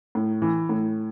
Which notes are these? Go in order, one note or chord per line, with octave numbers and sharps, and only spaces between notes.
A2
E3
A2